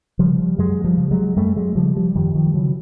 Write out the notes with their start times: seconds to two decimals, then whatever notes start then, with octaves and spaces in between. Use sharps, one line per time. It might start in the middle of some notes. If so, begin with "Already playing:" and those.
0.19 C#3 F3 G3
0.58 F#2 F#3 G#3
0.84 F3 G3
0.97 C#3
1.11 F#3 G#3
1.37 F#2 G3 A3
1.56 F#3 G#3
1.76 C#3 F3 G3
1.96 F3 G3
2.16 F#2 D#3 F3
2.34 D#3 F3
2.47 G3
2.54 C#3 E3 F#3